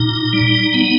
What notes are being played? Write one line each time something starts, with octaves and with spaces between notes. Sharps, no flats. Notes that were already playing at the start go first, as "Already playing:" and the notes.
Already playing: A#2 D#4
G3
B3